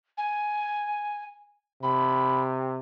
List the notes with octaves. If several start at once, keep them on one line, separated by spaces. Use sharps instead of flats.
G#5
C3 B5